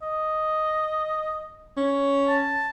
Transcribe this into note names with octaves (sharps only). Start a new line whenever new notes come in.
D#5
C#4
A5